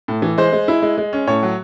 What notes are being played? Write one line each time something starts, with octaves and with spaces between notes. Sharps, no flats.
A2
E3
G#3 C5
G#3
E4
G#3
G#3
C#4
A2 C#5
F#3